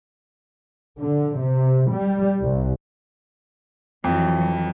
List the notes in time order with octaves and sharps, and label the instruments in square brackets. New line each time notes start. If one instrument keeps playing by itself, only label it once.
[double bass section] D3
C3
G3
C2
[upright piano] F2 [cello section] E3 F#3